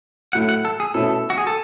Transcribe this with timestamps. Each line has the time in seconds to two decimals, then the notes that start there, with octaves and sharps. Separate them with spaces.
0.33 A2 F#3 A3 E4 F#5
0.49 F#5
0.65 A4
0.80 G#4
0.94 B2 A3 C#4 E4 A4
1.30 F#4
1.38 G#4
1.47 A4